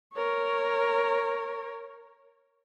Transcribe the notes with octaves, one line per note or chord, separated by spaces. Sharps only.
A#4 C#5